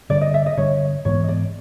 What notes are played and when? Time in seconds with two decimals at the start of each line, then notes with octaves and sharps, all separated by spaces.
0.10 G2 D3 G3 D5
0.21 D#5
0.34 E5
0.46 D#5
0.57 G2 D3 G3 C#5
1.05 G#2 E3 G#3 B3 C#5
1.24 D#5
1.28 D5